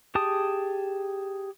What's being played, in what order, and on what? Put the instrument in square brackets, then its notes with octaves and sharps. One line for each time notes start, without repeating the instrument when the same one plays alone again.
[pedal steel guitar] G4 G#4 A5 D#6